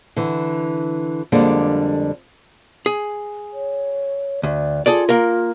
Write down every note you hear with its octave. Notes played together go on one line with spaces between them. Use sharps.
D3 E3
F2 D3 G3 G#3 A#3 D4
G#4
C#5
D2 D5
F4 G#4 A4 D5
A#3 A#4